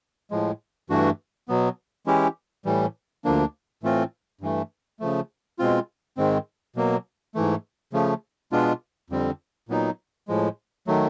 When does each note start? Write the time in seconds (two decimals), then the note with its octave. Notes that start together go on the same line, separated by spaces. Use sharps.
0.31 A2 F3 G#3
0.90 G2 E3 A3 D4 F#4
1.48 B2 F#3 B3
2.06 E3 G#3 C#4 E4 G4
2.65 A2 E3 G3
3.25 D2 D3 F3 A#3 D4
3.83 A2 E3 A3 C4 F4
4.41 G2 E3 A3
5.00 C#3 F3 A3
5.59 B2 G#3 C4 F4
6.17 G#2 D#3 G#3 C4
6.76 B2 F#3 A#3
7.35 G#2 E3 A3
7.93 C#3 F3 A3
8.52 B2 G#3 B3 D4 F4
9.10 F2 D3 G3 C4
9.69 A#2 F#3 B3 D#4
10.28 A2 F3 G#3
10.87 D#3 F#3 A3